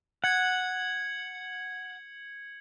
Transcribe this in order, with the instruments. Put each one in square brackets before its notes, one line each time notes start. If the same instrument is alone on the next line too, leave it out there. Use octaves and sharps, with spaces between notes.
[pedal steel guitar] F#5 [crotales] G#6 C#7 F#7